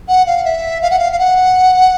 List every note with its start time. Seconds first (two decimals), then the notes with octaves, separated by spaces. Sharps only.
0.08 F#5
0.27 F5
0.45 E5
0.82 F5
0.91 F#5
0.99 F5
1.12 F5
1.19 F#5